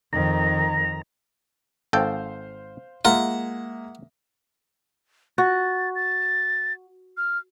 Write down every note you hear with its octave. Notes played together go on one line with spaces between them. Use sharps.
F2 D#3 A#5
G#1 A4 C5 F5 G5
G#3 A#3 F4 A#4 E5 F#5
F#4 A6
A6
F6